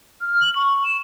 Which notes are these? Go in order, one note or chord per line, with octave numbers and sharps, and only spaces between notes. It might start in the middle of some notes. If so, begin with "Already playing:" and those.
F6
F#7
C#6
E7